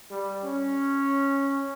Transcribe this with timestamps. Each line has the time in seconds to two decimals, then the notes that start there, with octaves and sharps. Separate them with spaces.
0.10 G3
0.44 C#4